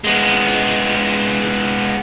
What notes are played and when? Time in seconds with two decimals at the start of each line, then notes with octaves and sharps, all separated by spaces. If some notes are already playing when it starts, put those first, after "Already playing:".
0.05 G#3 B3